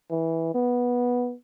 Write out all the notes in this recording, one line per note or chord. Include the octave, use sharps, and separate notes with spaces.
E3
B3